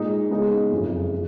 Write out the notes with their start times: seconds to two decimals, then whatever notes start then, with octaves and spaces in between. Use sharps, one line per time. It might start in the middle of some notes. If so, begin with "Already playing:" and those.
Already playing: A#2 G#3 D#4
0.30 C#3 G#3 B3 D#4
0.71 F#1 F2 C#3
1.12 C#3